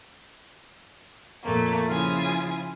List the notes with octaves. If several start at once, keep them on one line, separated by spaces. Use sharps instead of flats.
F2 A#2 A3 A#3
C#3 F3 E4 F4 G#5 D#6